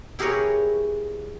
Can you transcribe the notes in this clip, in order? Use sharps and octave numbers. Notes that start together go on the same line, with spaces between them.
E4 G4 G#4 A#4 B4 C#5